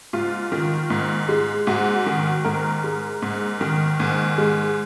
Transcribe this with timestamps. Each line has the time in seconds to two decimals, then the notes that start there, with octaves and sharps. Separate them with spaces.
0.13 G#2 F4
0.52 D#3
0.90 G#2
1.28 G#3
1.67 G#2 F#4
2.06 D#3
2.45 G#2 A#4
2.84 G#3
3.22 G#2
3.61 D#3
4.00 G#2
4.38 G#3